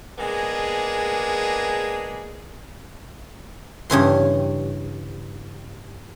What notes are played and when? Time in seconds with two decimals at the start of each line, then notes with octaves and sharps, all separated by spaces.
0.18 G#3 A#3 B3 D4 G#4
3.90 G2 C#3 E3 C6